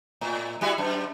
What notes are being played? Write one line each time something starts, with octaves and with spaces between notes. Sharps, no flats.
A2
G3 E4 F#4
F#2